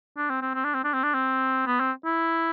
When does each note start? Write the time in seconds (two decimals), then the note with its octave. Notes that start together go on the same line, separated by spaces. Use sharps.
0.17 D4
0.30 C4
0.42 C4
0.54 C4
0.65 D4
0.74 C4
0.84 D4
0.94 C4
1.04 D4
1.14 C4
1.67 B3
1.80 C4
2.05 E4